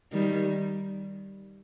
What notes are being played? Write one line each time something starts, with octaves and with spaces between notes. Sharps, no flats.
D#3 G3